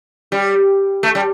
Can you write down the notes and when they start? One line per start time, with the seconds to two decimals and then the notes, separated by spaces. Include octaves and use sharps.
0.32 G3
1.03 A3
1.15 G3